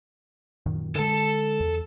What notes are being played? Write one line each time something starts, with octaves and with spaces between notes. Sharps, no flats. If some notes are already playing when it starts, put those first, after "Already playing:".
F#2 A#2 D#3
D3 G#3 A4 A5
E2